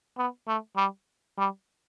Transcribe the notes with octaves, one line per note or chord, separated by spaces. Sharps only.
B3
A3
G3
G3